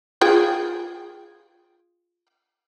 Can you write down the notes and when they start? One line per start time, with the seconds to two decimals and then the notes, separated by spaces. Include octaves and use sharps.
0.21 F4 G#4 G5